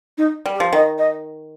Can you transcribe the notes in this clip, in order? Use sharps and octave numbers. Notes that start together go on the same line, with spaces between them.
D#4
G3
G4
F3
D#3 D#5
D#5